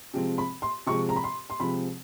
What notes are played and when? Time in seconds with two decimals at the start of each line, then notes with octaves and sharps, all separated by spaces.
0.14 C3 F3 G#3 C4
0.38 B5
0.62 C6
0.87 C3 F3 G#3 C4 C#6
1.09 A#5
1.16 B5
1.24 C6
1.50 C6
1.60 C3 F3 G#3 C4 B5